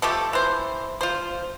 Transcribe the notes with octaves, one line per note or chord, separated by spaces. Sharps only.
F3 A3 G4 A4
E3 C5
F4 C5